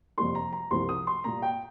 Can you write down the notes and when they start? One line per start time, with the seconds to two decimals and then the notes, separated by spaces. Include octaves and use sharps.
0.18 F2 C3 G3 A#3 C6
0.35 A#5
0.52 A#5
0.71 C2 C3 F3 C6
0.89 D#6
1.07 C6
1.24 A#2 G3 A#3 A#5
1.42 G5